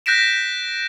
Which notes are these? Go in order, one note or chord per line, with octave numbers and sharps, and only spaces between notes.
F#6 G6 A#6 B6 D7 E7